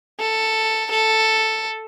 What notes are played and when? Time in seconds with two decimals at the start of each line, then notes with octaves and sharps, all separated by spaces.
0.20 A4
0.91 A4